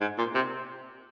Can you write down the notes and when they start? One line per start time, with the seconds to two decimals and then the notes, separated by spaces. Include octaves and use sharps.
0.01 G#2
0.18 A#2
0.35 C3